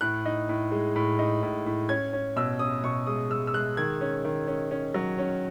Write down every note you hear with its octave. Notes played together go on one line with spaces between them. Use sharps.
A2 F#6
D#4
A2
G#3
A2
D#4
A2
A2
C#4 G#6
C#4
B2 E6
C#4 D#6
B2 C#6
G#3 D#6
G#3 E6
E6
G#3 F#6
D#3 G#6
C#4
D#3
C#4
C#4
F#3
C#4